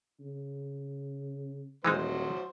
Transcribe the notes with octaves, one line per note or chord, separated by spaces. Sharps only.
C#3
D#1 E3 F#3 G#3 D#4 C5